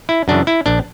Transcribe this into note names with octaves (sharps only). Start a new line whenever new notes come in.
E4
F#2 C#3 E3 D4
E4
A#1 D4